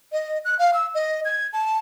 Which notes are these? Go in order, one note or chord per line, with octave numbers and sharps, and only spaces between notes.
D#5
F#6
F5
E6
D#5
G#6
A5